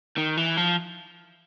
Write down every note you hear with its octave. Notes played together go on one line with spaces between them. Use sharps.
D#3
E3
F3